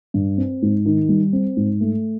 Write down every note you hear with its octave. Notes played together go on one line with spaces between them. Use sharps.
G2
C4
G#2
D#3
G3
C4
G#2
A3